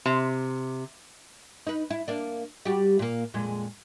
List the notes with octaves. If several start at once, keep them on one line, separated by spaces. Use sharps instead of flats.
C3
D#4 B4
E4
A#3 D4
G3 F#4 G4
A#2 A#3
F2 A#2 G#3